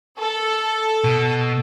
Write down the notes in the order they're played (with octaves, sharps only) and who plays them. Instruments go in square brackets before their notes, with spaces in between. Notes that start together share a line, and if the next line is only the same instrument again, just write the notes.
[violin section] A4
[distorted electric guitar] B2